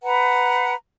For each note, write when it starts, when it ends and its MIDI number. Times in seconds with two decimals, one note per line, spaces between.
0.03 0.75 71
0.03 0.75 78
0.03 0.75 82